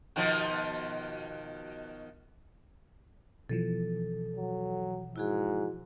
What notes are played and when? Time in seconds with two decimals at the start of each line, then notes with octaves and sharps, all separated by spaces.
0.16 B2 D#3 F3
3.49 B2 E3 F3 A4
4.36 F#3
5.16 G#2 E4 F#4 G#4